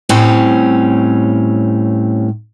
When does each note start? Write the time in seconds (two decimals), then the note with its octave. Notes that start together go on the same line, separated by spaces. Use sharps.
0.09 A2 G3 C4 C#4